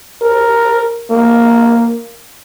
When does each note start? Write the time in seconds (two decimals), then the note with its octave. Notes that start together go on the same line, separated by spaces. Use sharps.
0.22 A#4
1.11 A#3